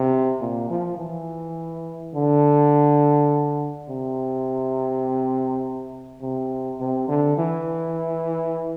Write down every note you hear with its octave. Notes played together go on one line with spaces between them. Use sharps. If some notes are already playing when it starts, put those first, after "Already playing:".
Already playing: C3
A#2
F3
E3
D3
C3
C3
C3
D3
E3